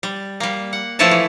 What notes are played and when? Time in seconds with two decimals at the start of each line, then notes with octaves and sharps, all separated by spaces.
0.03 G3
0.40 G3 A#3
0.73 F#5
0.99 F3 A3 E4 B4 C#5 A5
1.11 E3